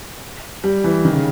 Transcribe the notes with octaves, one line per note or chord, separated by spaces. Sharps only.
G3
E3
D#3
C#3